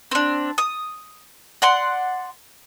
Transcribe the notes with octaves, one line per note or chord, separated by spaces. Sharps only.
C4 D4
D#6
D5 F#5 C6